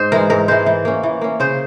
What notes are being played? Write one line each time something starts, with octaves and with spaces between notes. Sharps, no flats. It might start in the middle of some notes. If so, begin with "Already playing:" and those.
Already playing: G#2 C5
E3 G#3 A#4
G#2 A#4
E3 G#3 C5
E3
A#3 C#4
E3
A#3 C#4
C#3 C5